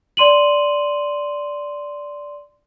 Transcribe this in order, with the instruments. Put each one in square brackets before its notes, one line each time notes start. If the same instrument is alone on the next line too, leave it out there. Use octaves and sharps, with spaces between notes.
[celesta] D5 C6 D#7 F#7